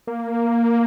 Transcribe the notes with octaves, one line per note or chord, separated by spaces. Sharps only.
A#3